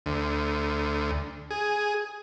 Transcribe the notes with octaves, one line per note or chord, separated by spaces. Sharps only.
D2
G#4